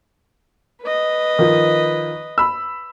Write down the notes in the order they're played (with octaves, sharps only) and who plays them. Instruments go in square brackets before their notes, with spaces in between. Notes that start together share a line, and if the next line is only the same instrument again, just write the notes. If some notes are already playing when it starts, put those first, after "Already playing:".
[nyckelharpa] B4 D#5
[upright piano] D#3 F3
B5 E6